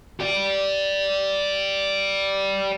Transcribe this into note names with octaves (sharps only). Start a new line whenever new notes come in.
G4 D5